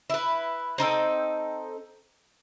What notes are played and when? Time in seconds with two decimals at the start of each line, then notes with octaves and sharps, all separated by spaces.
0.10 E4 B4
0.78 C4 D#4 A4 G5